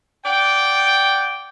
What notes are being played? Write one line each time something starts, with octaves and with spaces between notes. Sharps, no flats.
D5 F#5 G5